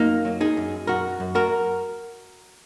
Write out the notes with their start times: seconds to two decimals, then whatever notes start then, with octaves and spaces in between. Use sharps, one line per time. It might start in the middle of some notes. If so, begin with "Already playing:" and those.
Already playing: F#2 A#3 D#4
0.25 F#3
0.41 D#4 G#4
0.57 F#2
0.87 F#2 F#4 A#4
1.20 F#2
1.35 F#4 A#4